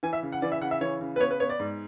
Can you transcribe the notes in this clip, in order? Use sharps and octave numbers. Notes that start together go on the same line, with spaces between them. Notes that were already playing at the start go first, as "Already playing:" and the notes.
E3 G#5
E5
C#3
F#5
E3 D5
E5
C#3 F#5
E5
E3 C#5
C#3
B4
B3 C#5
B4
B3 C#5
D5
G#2